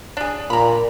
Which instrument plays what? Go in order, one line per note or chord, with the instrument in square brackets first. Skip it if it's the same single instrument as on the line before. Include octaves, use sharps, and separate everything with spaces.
[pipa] D4 G#4
[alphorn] A#2 [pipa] A#5 B5